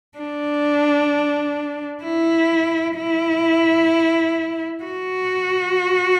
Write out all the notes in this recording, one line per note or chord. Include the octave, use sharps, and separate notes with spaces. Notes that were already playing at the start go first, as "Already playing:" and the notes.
D4
E4
E4
F#4